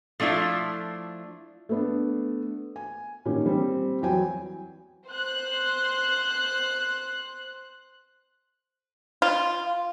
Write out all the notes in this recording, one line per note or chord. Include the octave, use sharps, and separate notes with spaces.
F3 A3 D4 E4 F4
A3 B3 D4
G#5
A#2 D#3 C#4 G4
G3 C4
E2 F#3 G5 G#5
C5 F#6
F4